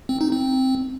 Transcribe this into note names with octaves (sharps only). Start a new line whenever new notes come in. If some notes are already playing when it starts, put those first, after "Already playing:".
C4
D#4
C4